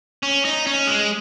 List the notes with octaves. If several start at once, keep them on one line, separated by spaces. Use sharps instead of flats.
C#4
D#4
C#4
G#3